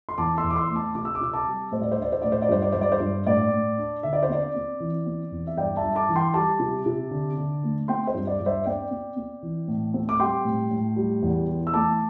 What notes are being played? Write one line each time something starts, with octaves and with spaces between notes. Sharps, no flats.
C6
E2 A5 D6
C6 E6
E2
D6
C6 E6
A3
A5 D6
C3 D6
E6
D6
C3 E6
A5 D6
G3
A2 C5
D5
C5
D4 D5
C5
A2 D5
C5
D5
G2 C5
D5
G2 C5
D5
C5
G2
A2 D5
A2
D4
D3 E5
D5
C5
C4 D5
C4
E3
C4
E2
E5
G2 D5 G5
E5 A5
G2
A5 D6
E3
G5 C6
G3 A5 D6
C3
C3
D3
D3
A3
C4 G5 C6
C5
G2
D5
G2
C5 E5
C4 D5 G5
C4
C4
E3
A2
C4
D6
G3 G5 C6
A2
A2
G3
E2
E3
E6
A3 A5 D6